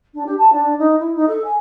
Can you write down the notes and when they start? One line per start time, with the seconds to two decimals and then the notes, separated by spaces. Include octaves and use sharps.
0.14 D4
0.26 G4
0.38 A5
0.53 D4
0.79 D#4
1.00 E4
1.16 D#4
1.28 A4
1.44 G#5